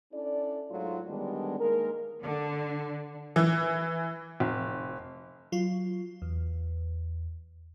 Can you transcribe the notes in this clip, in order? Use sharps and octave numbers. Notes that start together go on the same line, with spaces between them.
C#4 D4 E4 A4 D5
G#2 F#3 A3 F4
D3 D#3 G3 G#3 B3 D4
D#3 G#3 A#3 A#4
D3
E3
F1
F#3 F4
E2